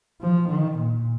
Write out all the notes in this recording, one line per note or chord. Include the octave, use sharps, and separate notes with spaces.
F3
D#3
A#2